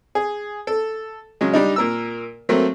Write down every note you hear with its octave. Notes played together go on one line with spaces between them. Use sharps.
G#4
A4
C#3 F#3 G#3
G3 D4 D#4
A#2 A#4 E6
F#3 A3 A#3 C4